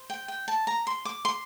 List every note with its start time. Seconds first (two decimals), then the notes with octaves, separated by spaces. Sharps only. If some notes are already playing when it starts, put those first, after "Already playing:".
Already playing: C5
0.10 G5
0.28 G5
0.48 A5
0.67 A#5
0.87 C6
1.05 D6
1.25 C6